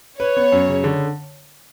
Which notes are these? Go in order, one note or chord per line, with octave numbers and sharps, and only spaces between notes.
B4 C#5
B3
F#2
C#3
D3